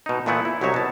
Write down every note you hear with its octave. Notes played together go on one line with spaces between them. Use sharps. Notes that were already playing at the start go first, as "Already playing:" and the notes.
B2 D#4
A#2 E3 A3 B3 E4 F#5
E4
C2 F#3 D#4 C#5 E5
B2 A5